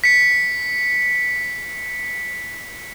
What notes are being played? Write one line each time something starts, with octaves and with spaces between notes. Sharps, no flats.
B6 C#7